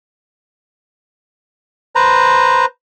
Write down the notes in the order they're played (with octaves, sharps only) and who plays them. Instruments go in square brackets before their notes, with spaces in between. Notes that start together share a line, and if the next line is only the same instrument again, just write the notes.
[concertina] B4 C5 A#5